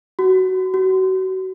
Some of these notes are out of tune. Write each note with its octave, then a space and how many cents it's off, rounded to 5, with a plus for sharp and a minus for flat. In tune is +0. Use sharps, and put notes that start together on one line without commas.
F#4 +15
F#4 +30